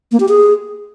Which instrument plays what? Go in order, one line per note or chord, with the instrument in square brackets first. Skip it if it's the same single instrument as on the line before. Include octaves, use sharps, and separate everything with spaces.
[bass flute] A#3
G4
G#4